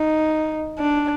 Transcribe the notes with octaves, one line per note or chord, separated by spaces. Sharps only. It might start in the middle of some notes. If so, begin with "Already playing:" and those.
Already playing: D#4
D4